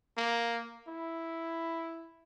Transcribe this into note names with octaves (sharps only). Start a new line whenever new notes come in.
A#3
E4